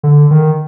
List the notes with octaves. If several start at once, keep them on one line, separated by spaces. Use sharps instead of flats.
D3
D#3